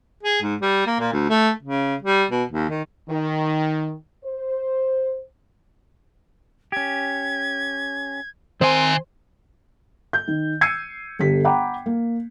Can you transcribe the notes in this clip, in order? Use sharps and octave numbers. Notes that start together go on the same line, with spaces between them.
G#4
G#2
G3
A#3
A#2
D2
A3
C#3
G3
B2
D#2
D#3
D#3
C5
C#4 G4 G#6
D#3 C4 A#4 C5 G#5 C6
G6
D#3
E6 G#6 C7 C#7 D#7
G1 G4 A4 B6
F#5 G5 A#5 B5 D6
A#3